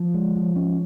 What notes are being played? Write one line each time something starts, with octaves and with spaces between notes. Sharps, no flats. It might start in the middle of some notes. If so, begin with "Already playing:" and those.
Already playing: F3
G#3
F3
C#4